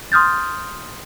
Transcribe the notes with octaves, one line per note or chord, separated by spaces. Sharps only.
C6 D#6 F6 G6 A6